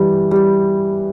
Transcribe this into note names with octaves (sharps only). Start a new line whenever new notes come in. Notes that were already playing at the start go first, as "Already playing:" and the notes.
Already playing: E3 G3
G3